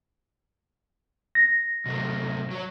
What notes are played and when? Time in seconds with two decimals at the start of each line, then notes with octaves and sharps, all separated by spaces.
1.35 A#6
1.86 C3 F#3 A3
2.51 F#3 C#5